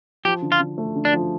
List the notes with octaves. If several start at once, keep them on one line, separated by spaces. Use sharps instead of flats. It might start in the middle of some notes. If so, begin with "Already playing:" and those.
F3 G4
D3
F4
D3
A3
D3
D4
F3